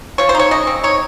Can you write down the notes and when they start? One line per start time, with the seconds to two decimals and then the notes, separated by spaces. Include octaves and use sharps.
0.18 F3 C#5
0.29 C5
0.35 D#4 C#5
0.51 C#3 D#5
0.67 C4
0.83 D#4 C#5